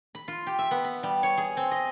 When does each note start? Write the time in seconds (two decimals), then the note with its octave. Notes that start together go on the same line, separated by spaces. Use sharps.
0.15 B5
0.28 F4
0.47 G4
0.59 E5
0.71 B3
0.84 B5
1.03 G3
1.23 C#5
1.37 G#4
1.57 C4
1.71 D#5